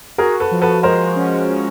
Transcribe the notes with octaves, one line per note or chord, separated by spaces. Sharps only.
F#4 G#4 A#4
A4 B4
F3
A4 B4
G#3 A#4 C5
C#4
C#4